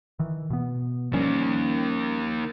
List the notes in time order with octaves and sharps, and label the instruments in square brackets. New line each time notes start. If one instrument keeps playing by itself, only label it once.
[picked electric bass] D#3 E3
B2 B3
[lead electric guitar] D#3 A#3 [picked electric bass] F3 G3 C#4